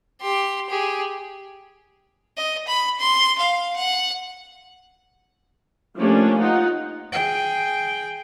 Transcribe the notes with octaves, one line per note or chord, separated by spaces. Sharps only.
G4 C6
G4 G#4
D#5
B5
C6
F5
F#5
F3 A3 A#3 C#4 D4 G4
D#4 F4 F#5
G#4 G5